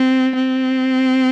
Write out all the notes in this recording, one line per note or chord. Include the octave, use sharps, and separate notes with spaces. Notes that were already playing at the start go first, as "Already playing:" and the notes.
Already playing: C4
C4